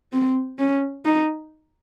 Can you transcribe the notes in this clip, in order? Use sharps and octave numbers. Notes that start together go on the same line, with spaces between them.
C4
C#4
D#4